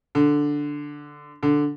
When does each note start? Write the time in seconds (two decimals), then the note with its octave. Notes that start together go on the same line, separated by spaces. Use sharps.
0.15 D3
1.43 D3